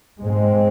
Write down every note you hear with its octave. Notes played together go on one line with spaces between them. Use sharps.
G#2 G#3 C4